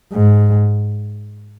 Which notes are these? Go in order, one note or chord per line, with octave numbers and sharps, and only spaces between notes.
G#2